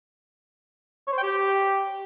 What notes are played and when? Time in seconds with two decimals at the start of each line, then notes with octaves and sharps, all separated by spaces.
1.08 C#5
1.13 C5
1.18 G5
1.23 G4